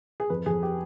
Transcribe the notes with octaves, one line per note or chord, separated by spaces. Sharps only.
G#4
F2 B4
F2 G#4
G4